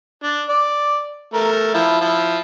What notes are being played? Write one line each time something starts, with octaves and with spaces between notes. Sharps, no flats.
D4
D5
A3 A#4
F3 E4
F3 E4